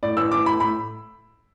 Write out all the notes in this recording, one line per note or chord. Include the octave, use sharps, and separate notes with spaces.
A2 D5
A1 E6
A1 D6
A2 B5
A2 B5